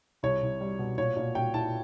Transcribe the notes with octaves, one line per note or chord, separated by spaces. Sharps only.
C2 C#5
C2
G3
B2
A#2 C#5
A#2
A#2 G5
E4 A5